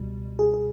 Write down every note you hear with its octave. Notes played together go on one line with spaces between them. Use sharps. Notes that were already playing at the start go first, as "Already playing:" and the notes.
Already playing: C#2 B2 G3
G#4
G#4